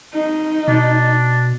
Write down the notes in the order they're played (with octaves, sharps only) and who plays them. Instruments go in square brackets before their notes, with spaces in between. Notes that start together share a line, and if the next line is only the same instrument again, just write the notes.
[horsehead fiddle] D#4
[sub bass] B2 [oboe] D4